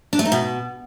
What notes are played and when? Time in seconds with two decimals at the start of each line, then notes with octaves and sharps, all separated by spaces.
0.13 D4
0.19 A3
0.25 D#4
0.32 B2